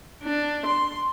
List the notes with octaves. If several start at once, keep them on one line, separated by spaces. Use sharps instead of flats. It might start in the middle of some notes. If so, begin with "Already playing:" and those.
D4
C6